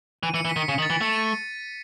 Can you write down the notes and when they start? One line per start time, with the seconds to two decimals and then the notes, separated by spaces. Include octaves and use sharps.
0.23 E3 D#7
0.34 E3 C#7
0.45 E3
0.49 B6
0.56 D#3
0.62 C#7
0.69 C#3
0.79 D#3
0.82 A6
0.90 E3 B6
1.01 A3 C#7
1.13 D#7